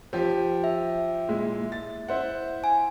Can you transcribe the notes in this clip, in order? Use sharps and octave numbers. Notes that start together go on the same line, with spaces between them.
F3 G4
E5
A#2 G#3 E4
A6
E4 C5 F#5
G#5